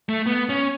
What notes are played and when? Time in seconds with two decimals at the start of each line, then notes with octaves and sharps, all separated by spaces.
0.09 A3
0.26 B3
0.49 C#4